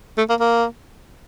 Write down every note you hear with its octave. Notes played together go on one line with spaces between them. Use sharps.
A3
A#3
A#3